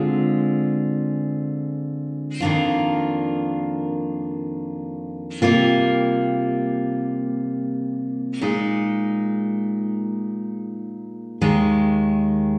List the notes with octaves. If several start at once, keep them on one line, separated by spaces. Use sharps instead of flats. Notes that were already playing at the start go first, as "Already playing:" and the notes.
Already playing: D3 G#3 C4 F4 G#4
F2 D#3 A#3 D4 F4
C3 G3 A#3 F4
A#2 G#3 D#4
D#2 D#3 G#3